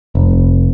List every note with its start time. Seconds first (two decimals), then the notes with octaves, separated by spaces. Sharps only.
0.15 F1